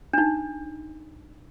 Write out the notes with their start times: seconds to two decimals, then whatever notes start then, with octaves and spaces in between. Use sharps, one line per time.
0.13 D4 D#4